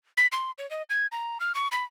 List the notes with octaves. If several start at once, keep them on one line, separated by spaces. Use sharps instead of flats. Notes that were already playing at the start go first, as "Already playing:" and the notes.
B6
C6
C#5
D#5
G#6
A#5
F6
C#6
B5